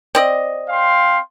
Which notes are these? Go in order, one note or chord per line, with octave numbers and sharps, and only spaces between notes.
C4 D5 D#5
F5 G5 C6